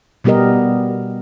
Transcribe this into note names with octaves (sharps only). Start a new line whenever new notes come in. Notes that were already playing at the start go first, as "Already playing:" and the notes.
B2 G3 B3 G4 A#4 D#5